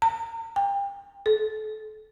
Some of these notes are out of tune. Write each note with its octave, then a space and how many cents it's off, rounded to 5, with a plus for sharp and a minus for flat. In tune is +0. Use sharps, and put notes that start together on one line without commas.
A#5 -40
G5 +30
A4 -35